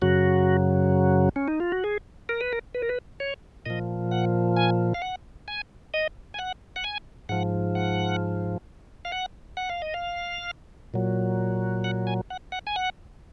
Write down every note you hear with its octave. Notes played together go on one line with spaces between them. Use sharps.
F#2 C#3 F#3 F#4
C#4
D#4
F4
F#4
G#4
A#4
B4
A#4
B4
A#4
B4
C#5
A#2 F3 D#5
F#5
G#5
F5
F#5
G#5
D#5
G#5
F#5
F#5
G#5
G#2 F3 F#5
F#5
F5
F#5
F#5
F5
D#5
F5
A#2 F#3
F#5
G#5
F#5
F#5
G#5
F#5